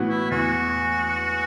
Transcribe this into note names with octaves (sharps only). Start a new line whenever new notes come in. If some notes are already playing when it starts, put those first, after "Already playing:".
Already playing: A2 E3 B3 F#4
E4
E2 F#4